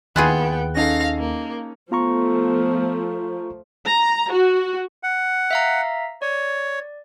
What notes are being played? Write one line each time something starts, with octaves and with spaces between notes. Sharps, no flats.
D#2 B3 E4 F4 G#4 G5 G#5 F#6
C#4 D#4 A4 F5 A#6
A#3
F3 A3 B3 F4 A#5 C#6
A#5
F#4
F#5
E5 F5 A#5
C#5 D5